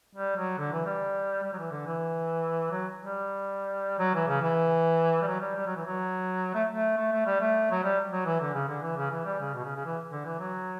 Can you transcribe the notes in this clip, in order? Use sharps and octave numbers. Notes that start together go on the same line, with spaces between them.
G3
F#3
D3
E3
G3
G3
F#3
E3
D3
E3
F#3
G3
F#3
E3
C#3
E3
G3
F#3
G3
G3
F#3
E3
F#3
A3
A3
A3
A3
G3
A3
F#3
G3
F#3
E3
D3
C#3
D3
E3
C#3
E3
G3
C#3
B2
C#3
C#3
E3
D3
E3
F#3